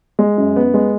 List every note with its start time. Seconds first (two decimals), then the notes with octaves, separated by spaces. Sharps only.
0.19 G#3
0.37 F#2
0.56 B3
0.74 G#3